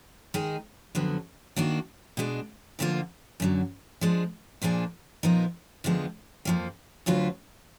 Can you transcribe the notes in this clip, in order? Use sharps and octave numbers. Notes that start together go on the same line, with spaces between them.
D#3 G#3 D#4 G#4
F2 D3 F#3 B3
D#3 A#3 D4 F#4
B2 G#3 D4
D2 D3 F3 A#3 F4
F#2 D3 F#3
F3 G#3 D4
A#2 F3 A#3 D4 G#4
A#2 F3 B3 D#4 A#4
F2 D3 F3 G#3 B3
F2 F3 A#3
D2 D3 F#3 B3 F4